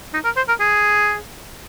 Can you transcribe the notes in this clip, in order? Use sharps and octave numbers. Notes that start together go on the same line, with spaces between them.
D#4
A#4
C5
A#4
G#4